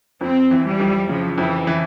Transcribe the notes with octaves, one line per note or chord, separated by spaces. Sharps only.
F2 C4
E3
G3
F2
C#3 F3
F2 E3
E3